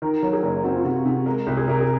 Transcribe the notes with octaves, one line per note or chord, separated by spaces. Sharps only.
D#3 A#4
F#3 A#4
G#4
F#1
C4 F#4
F4
C3 F#4
C3
G#3 A#4
C2
G#4
C2 A#4
G#4